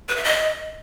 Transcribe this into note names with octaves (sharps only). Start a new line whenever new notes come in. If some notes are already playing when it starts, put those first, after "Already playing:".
B4
E5
D#5